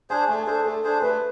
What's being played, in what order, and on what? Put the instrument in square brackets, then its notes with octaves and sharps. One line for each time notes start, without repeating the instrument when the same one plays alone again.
[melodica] D4 G#4 C5 [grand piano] G#5
[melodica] A3 [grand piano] G#5
[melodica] D4 G#4 C5 [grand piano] A4
[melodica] A3 [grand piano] A4
[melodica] D4 G#4 C5
[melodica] A3 [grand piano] B4